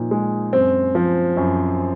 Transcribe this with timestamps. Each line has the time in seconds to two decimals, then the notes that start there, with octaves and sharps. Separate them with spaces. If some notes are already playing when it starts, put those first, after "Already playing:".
Already playing: A#2 F3 D#4
0.11 G#3
0.53 F#2 C4
0.95 F3
1.37 F#2